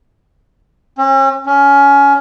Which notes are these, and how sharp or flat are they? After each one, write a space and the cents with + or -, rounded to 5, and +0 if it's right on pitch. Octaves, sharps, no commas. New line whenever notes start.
C#4 -40
C#4 +20